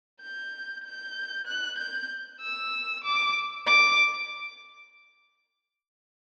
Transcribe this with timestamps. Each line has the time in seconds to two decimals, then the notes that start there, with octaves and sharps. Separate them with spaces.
0.21 G6
0.84 G6
1.47 F#6
1.78 G6
2.41 E6
3.04 D6
3.67 D6